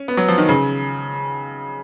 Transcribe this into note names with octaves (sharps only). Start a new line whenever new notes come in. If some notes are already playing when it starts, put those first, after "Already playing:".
Already playing: C#4
B3
F#3
F3
D#3
C#3